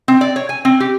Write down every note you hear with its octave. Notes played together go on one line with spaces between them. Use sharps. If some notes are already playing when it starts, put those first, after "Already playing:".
C4
D5
C#5
G#5
C4
G4